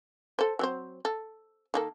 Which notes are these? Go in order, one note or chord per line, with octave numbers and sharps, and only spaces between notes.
A4 C5
F#3 C4 C5
A4
D#3 A#3 A4